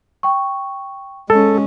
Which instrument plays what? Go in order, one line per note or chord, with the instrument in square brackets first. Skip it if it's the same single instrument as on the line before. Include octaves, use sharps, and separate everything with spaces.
[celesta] G5 C#6
[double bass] G#3 C#4 [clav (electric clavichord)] A4